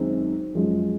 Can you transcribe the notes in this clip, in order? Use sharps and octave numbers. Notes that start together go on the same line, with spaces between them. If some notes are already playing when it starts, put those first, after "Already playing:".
Already playing: F#2 D#3 G#3 C4
F#2 F3 G#3